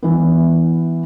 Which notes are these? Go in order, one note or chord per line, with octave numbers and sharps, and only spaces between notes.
E3 B3